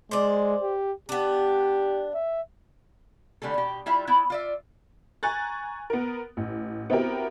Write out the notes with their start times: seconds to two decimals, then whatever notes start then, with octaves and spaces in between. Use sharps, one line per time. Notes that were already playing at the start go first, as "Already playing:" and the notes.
0.11 G#3 C5 D5
0.62 G4
1.09 B3 D4 G4
2.15 E5
3.42 D3 G3 A3 A4
3.54 B2 G4
3.86 G3 E4 F4 E5
4.07 B3 E4
4.30 F4 D5 E5
5.23 G#5 A#5 C#6 F#6 A6
5.90 B3 A#4
6.37 A1
6.90 B3 C4 E4 F#4 G4 A#4